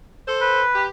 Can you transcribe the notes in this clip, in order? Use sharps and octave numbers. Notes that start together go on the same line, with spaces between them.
A4 C5
B4
G4